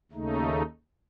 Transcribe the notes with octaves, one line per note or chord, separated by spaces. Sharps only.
D#2 C#3 A3 D#4